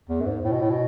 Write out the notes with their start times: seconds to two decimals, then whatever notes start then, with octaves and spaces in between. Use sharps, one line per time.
0.09 E2
0.20 F#2
0.27 G#2
0.44 A2
0.52 B2
0.61 A2
0.70 B2